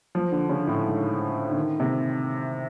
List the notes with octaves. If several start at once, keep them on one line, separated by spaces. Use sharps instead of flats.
F3
D3
C#3
A2
G#2
D3
D#3
C3